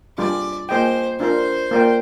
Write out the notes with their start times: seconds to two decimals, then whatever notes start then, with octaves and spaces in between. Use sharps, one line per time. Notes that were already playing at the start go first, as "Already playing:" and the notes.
0.18 G3 D4 F4 G#4 D5
0.69 A#3 F4 G#4 C5 D#5 G5
1.20 D4 F4 A#4 C5
1.71 A#3 F4 A#4 D5 G5